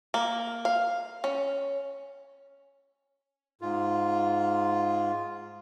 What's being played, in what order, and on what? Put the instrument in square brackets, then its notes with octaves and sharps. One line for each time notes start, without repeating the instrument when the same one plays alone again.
[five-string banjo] A#3
F5
C#4
[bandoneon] G#2 F4